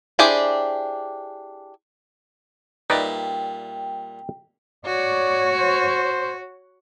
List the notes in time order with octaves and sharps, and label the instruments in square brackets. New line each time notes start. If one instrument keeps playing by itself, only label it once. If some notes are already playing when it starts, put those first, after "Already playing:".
[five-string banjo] D4 E4 G4 G#4 C5
[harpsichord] A#2 G3 E5 [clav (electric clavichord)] D#4 B4 D5 [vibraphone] G5
[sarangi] F#4 [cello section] C#5 [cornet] D5
[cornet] C5